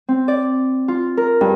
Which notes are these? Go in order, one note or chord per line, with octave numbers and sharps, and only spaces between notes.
C4
D5
F4
A#4
G2